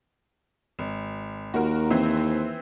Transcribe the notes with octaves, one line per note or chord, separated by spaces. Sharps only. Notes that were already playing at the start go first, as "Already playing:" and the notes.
G#1
D#2 F#4 A#4
E3 C4